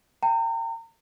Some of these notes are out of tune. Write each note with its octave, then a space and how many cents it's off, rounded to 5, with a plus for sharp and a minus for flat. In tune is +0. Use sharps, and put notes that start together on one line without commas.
G5 +0 A#5 -35